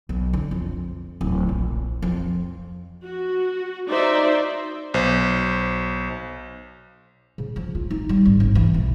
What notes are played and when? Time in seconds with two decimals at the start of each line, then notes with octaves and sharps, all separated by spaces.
0.09 B1
0.33 D3
0.51 F2
1.21 D1
1.49 A#1
2.02 F2
3.03 F#4
3.89 D#4 F#4 C5 D5 E5
4.94 B1 C5
7.38 C#3
7.56 F3
7.75 F4
7.90 D#4
8.09 G3
8.25 G#1
8.40 C#3
8.55 E3
8.74 B1